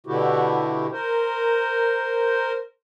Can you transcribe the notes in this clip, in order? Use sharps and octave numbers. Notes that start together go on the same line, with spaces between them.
B2 D3 A3 E4 F#4 G4
A#4 C5